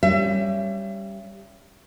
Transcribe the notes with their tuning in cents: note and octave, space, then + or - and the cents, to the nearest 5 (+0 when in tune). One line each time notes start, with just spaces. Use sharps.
G3 +0 C#4 +0 E5 +35